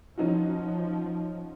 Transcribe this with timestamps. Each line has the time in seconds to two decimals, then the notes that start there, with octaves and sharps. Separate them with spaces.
0.18 F3 C#4 D#4 F#4